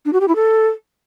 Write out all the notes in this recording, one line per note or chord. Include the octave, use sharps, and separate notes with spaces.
D4
F#4
G4
E4
A4